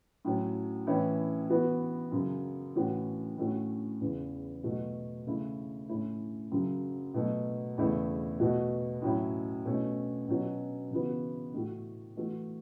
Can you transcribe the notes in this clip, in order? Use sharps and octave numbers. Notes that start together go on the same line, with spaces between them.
A2 F#3 C#4
A2 E3 C#4 E4
E3 B3 F#4
F#2 C#3 F#3
A2 E3 C#4 F#4
A2 A3 C#4 F#4
E2 C#3 E3
B2 F#3 A3 F#4
C#3 A3 E4
A2 A3 C#4 E4
F#2 C#3 F#3
B2 F#3 A3
E2 C#3 A3 E4
B2 A3 F#4
A2 F#3 C#4 E4
B2 A3 C#4
B2 F#3 C#4 F#4
C#3 E3 B3 F#4
A2 A3 F#4
E3 A3 F#4